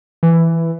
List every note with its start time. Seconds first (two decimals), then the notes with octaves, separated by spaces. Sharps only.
0.23 E3